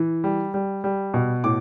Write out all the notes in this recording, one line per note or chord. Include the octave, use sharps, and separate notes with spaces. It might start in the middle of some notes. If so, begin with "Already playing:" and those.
Already playing: E3
G3
G3
G3
B2
A2 D6